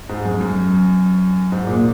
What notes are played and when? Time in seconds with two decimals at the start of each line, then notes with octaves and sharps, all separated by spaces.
0.09 G#2
0.25 F#2
0.41 F#2
1.52 G#2
1.67 A#2